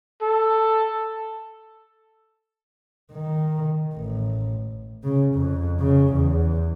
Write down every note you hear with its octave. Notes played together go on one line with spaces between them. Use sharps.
A4
D#3
A1
C#3
F2
C#3
E2